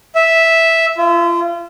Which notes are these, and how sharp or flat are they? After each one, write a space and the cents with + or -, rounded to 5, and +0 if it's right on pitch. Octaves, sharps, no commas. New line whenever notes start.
E5 -5
F4 -35